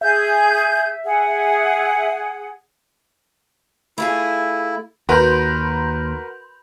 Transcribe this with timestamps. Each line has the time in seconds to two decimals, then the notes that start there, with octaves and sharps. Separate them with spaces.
0.01 G#4 E5 G6
1.04 G#4 F#5
3.98 A3 E4 F4 G#4
5.09 D#2 F#4 A#4 B4 B5 C6 G6